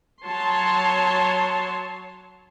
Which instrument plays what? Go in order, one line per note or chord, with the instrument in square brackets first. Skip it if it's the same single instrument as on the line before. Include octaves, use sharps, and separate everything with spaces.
[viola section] F#3 C#5 A5 C6